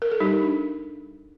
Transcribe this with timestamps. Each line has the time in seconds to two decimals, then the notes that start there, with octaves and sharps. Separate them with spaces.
0.02 A#4
0.11 A4
0.20 G3 D#4 G4
0.42 D4